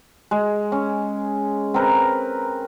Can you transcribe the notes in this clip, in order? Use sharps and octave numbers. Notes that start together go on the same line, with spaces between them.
G#3
C#4
C4 A#4 B4